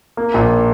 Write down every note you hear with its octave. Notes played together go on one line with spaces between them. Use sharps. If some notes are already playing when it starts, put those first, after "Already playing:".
A#3
A#1